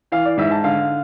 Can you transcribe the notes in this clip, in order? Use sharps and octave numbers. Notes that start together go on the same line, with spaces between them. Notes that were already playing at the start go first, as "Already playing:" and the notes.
E3 F5
D5
G#2 E5
A5
D3 F5